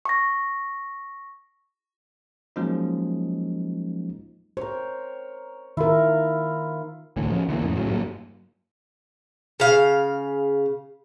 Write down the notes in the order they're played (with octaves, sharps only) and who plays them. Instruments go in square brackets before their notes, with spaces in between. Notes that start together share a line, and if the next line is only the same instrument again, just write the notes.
[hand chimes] C#6 A#6
[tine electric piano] F3 F#3 G#3 A#3 C#4 D#4
[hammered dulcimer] A#4 C#5 [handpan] C5
[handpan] D#3 A#4 [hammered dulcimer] E4 F4
[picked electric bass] D2 A2 D3 E3
F3 C#4
D3 E3 G#3 A#3
F2 A2 C#3
A2 C#3 F#3
G2 F#3 A#3
[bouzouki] C#3 F5